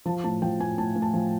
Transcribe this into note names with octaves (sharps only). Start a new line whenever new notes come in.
F3 A5
A2 A5
F3 G5
A2 G#5
A2 A5
A2
A5
F3